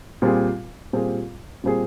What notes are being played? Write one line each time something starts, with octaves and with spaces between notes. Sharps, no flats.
A#2 G3 C4 F4 G#4
A#2 G3 C4 F4 G#4
A#2 G3 C4 F4 G#4